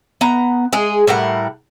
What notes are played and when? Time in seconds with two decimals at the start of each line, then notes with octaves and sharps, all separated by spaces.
0.21 B3 A#5
0.73 G#3 G#4
1.07 A2 G3 A#4 F#5